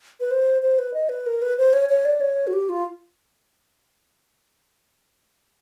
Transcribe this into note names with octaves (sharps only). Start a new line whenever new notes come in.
B4
C5
C5
B4
D#5
B4
A#4
B4
C5
C#5
C#5
D5
C#5
F#4
G4
F4